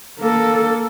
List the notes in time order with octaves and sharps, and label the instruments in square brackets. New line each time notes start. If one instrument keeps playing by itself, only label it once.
[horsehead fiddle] A#3 A4